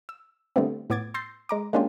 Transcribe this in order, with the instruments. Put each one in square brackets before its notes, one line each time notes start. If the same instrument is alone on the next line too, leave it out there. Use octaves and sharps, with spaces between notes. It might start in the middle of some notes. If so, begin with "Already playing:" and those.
[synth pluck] E6
D3 G3 A3 B3 C4
A2 B3 D6 G#6 A6
C6 E6 G6 A6 A#6 C7
G#3 A#5 D6
G#3 A#3 C#4 D4 F4 G4